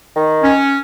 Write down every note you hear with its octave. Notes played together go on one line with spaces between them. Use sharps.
D#3
C#4